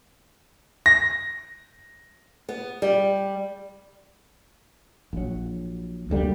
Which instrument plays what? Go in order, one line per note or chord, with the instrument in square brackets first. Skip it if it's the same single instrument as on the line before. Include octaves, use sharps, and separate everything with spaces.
[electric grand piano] A#6
[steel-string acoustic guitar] B3
G3
[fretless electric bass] A#1 F#3
F1 D2 G3 A#3